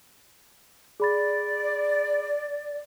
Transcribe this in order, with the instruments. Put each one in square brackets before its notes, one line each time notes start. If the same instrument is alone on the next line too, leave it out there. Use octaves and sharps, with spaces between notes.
[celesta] G#4 B5 A6 [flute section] D5